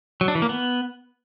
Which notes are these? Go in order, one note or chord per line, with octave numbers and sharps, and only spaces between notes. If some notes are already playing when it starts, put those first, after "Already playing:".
F#3
D4
E3
A#3
B3